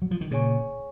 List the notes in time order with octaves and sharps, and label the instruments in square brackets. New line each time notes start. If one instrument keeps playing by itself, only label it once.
[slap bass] F#3
F3
D#3
[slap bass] A#2 C#3 [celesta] G#4 C#5 G#5 C#6